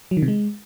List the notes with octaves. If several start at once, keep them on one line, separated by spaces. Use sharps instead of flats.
F#3
D#3
C3
G#3